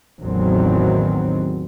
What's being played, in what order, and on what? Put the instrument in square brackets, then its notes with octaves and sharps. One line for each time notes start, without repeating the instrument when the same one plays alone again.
[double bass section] A1 E2 D#3 F#3 C4